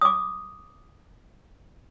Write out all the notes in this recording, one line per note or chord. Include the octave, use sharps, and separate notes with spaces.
D6 D#6